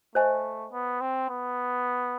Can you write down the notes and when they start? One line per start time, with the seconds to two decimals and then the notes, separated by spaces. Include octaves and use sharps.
0.15 A3 C5 D#5 G#5
0.72 B3
1.01 C4
1.29 B3